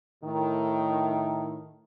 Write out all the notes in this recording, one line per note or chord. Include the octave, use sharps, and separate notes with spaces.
A2 D#3